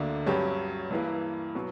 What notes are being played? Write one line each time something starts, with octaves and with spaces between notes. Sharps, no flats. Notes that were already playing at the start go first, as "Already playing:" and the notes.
Already playing: D2 D3 A#3 D4
G2 F#3 C#4 G4
G2 E3 A#3 E4
B2 F#3